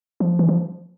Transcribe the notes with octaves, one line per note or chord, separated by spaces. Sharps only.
F3
E3
F3